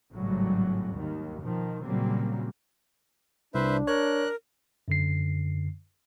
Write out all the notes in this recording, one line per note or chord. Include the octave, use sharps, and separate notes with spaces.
G#1 A2 C#3 F#3 G3
D#2 D#3
B2 D#3 F3
A#2 C#3 F#3 G3 A#3 C4
C2 D4 B4 C5 E5
A#4 C#5 F#6
F#2 D3 C7